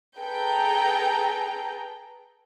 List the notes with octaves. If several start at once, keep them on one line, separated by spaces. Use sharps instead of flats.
G#4 A4 B4 G5 A#5